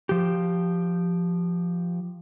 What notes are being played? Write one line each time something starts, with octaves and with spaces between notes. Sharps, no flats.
F3 G4